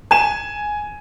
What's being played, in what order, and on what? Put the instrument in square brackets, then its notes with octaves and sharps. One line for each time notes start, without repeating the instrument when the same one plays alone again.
[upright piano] G#5 E7